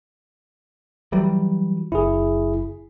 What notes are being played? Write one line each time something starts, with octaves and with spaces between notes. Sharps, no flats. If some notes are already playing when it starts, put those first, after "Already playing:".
E3 F#3 G3
F#1 E4 G#4